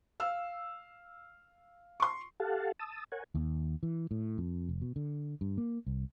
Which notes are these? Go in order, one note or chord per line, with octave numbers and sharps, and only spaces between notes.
F5 E6
C6 C#6
G4 A4 F5 F#5 A5
A5 D#6 E6
A#4 C#5 F#5 G#5
D#2
E3
A2
F2
F1
B2
D3
G2
A#3
C2